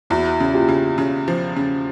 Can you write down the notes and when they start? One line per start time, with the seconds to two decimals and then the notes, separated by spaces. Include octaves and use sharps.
0.10 E2 E4 F#4
0.40 C#3
0.54 F4 G4
0.68 C#3
0.98 C#3
1.28 F3
1.56 C#3